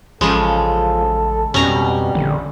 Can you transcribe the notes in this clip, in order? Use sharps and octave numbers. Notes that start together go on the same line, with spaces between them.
A1 C#3 F3 G#3 A4
F2 B2 G3 C#4 A#5
A#1 D3